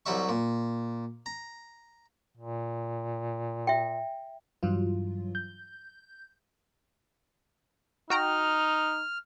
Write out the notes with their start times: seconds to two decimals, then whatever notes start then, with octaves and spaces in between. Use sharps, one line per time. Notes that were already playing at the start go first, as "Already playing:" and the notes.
0.06 C2 F#3 G3 E5 C#6
0.29 A#2
1.26 A#5
2.37 A#2
3.67 E5 G5
4.63 G2 E3 F#3 F4
5.35 G6
8.10 D#4 F#4 G5 A#5 F6